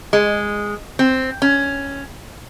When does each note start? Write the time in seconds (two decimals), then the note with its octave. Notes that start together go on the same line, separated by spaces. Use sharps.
0.13 G#3
0.99 C4
1.42 C#4